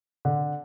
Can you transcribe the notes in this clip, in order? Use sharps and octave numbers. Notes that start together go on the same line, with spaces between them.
D3